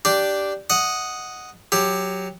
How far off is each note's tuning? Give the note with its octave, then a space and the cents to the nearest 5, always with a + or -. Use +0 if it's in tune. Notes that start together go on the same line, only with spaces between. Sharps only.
D4 +0 G4 -5
D#5 +0 F#5 +0
F#3 +0 G4 +10